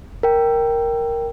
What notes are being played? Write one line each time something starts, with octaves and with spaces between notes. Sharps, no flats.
A#4 G5